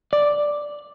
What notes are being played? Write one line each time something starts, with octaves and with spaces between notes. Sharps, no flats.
D5